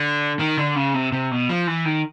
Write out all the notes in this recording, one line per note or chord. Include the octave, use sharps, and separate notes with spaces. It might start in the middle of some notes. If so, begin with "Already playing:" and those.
Already playing: D3
D#3
D3
C#3
C3
C3
B2
F3
E3
D#3